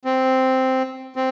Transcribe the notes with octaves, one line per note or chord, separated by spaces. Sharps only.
C4
C4